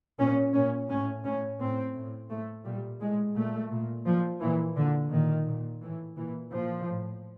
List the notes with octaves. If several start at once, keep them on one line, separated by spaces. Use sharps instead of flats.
A#2 C#4
A#2 C#4
A2 C#4
A2 C#4
A2 C4
A2
A2 A3
A#2 G3
A2 G#3
A#2 A3
A#2
A#2 F3
A#2 E3
A#2 D3
A#2 D#3
A#2
A2 E3
A#2 E3
A#2 F3
A2